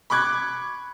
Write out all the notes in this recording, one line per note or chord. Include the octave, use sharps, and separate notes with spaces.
B5 C#6 D6 F#6 G#6